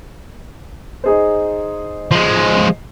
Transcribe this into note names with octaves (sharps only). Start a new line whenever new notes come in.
D#4 G#4 C5
F3 G#3